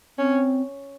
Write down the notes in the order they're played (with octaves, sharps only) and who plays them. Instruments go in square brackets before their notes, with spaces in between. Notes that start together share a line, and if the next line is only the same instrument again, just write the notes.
[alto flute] C4 [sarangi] C#4